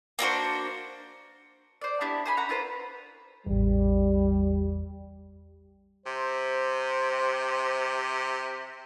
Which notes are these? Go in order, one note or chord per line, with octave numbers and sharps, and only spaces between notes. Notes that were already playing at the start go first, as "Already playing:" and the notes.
A#3 D4 F#4 C5
C5 D5
B3 D4 E4 G4
C5 G#5 B5
C#4 F#5 A#5 B5
E4 F4 B4 C5
A1 E2 G3
C3 C5